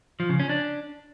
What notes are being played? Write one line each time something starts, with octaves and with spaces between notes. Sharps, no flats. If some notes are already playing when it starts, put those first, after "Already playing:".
F3
C#3
C#4
D4